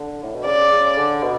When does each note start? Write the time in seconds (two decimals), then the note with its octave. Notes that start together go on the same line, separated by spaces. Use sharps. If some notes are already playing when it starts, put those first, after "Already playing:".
Already playing: D3
0.23 A2
0.35 B2
0.45 C#3 D5
0.72 C#3
0.98 D3
1.23 B2